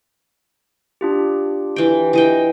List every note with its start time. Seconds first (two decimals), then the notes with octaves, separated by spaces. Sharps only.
1.01 D4 F4 G4
1.76 E3 G5
2.13 E3 D#5 G5